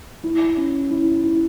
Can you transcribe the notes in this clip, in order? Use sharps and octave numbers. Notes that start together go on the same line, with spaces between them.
E4
C#4
E4
E4